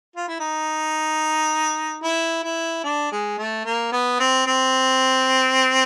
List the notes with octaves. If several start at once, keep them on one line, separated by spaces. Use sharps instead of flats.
F4
E4
D#4
E4
E4
D4
G#3
A3
A#3
B3
C4
C4